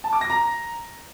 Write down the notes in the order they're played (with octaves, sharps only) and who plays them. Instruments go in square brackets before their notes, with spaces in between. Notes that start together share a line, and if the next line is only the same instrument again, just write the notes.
[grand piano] A5
D6
A#6
A#5